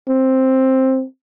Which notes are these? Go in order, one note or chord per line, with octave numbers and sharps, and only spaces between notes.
C4